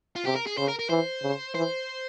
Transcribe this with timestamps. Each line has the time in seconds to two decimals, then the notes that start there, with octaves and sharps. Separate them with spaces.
0.16 F4
0.25 C3 G4
0.35 A#4
0.46 G#4
0.57 C#3 C5
0.68 A#4
0.79 A#4
0.89 E3 C5
1.22 C#3
1.55 E3 C5